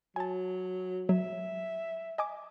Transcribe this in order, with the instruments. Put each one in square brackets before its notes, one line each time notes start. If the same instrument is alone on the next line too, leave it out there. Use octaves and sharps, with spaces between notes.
[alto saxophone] F#3 [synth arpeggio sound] G#5 A5
[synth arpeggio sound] F#3 [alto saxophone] E5
[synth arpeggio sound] D#5 G#5 D6